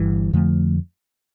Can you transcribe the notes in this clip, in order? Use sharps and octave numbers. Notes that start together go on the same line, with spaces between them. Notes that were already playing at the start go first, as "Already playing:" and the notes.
Already playing: G1 G2 E3
F2 D3 F3 A3